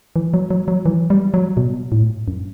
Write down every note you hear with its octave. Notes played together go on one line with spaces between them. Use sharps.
E3
F#3
F#3
F#3
E3
G3
F#3
B2
A2
F#2